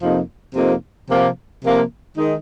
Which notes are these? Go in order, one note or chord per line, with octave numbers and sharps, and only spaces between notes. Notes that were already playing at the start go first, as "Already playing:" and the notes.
F2 C3 F3 A#3 D#4
F2 C3 F3 A#3 D#4
C3 F3 A#3
C3 F3 A#3
D#3 G#3 D#4